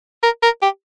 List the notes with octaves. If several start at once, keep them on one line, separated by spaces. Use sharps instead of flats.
A#4
A#4
G4